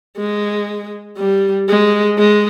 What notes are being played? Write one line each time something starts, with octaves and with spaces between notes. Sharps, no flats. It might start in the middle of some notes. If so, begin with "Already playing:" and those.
G#3
G3
G#3
G#3